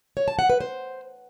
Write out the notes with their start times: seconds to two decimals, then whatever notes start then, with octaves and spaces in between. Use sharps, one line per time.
0.17 C#5
0.28 A5
0.39 F#5
0.50 B4
0.61 C5